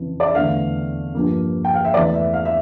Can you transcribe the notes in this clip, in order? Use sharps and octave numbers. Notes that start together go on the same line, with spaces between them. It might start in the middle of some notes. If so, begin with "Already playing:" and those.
Already playing: F2 C#3 E3
D5
E5
E2 D3 A3 F5
G2 F3 A#3
G5
F5
E5
E2 E3 A3 D5
E5
F5
E5